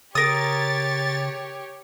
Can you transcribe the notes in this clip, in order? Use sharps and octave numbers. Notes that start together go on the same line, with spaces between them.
C#3 G4 A#4 C#5 D#6 A6